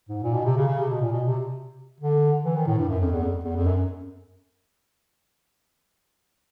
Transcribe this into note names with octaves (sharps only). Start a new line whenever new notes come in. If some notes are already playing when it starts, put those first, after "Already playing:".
G#2
A#2
B2
C3
C#3
C#3
C3
B2
A#2
B2
C3
D3
E3
D#3
A2
G2
F#2
F2
E2
F2
E2
F2
F#2